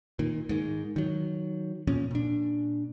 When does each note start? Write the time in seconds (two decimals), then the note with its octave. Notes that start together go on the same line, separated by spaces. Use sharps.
0.19 A#2 D#3
0.49 G#2 D#3
0.96 D#3 F#3
1.87 F2 A#2 F3 C#4
2.11 A#2 D4